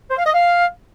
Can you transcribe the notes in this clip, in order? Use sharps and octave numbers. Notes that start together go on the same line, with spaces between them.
C5
F5
D#5
F5